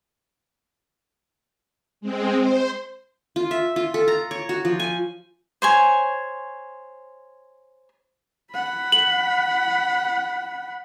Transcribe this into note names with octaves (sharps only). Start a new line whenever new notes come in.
G#3 C4
C5
F4
E5
F4
A4
A#5
C#5
F#4
F3
G#5
C5 C#5 G#5
F#5 B5
F#7